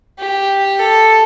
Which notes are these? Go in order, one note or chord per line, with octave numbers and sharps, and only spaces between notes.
G4
A4